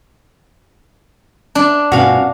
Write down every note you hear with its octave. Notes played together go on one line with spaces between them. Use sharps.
D4
G2 B2 C#4 F#4 F5